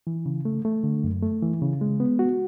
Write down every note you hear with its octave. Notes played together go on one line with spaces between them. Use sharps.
E3
C#3
A3
A3
D3
F#2
A3
E3
C#3
G#3
B3
F#4